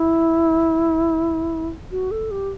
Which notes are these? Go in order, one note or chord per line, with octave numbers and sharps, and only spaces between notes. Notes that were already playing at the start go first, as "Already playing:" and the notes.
Already playing: E4
F#4
A4
G4